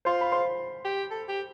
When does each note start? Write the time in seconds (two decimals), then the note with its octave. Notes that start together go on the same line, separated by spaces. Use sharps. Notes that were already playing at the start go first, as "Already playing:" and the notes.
0.05 F4 C5 C6
0.21 B5
0.32 C5 C6
0.85 G4
1.11 A4
1.28 G4